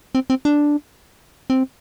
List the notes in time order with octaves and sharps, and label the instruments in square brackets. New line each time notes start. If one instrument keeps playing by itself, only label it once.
[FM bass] C4
C4
D4
C4